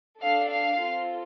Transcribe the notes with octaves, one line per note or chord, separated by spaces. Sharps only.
D4 A4 F5
F5
C4 F4 A4